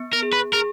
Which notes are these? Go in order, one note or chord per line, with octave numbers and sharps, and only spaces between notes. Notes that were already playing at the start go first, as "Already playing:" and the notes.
Already playing: B3
A#4
G#4
B4
G#4 A#4